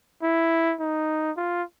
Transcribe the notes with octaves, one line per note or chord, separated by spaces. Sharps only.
E4
D#4
F4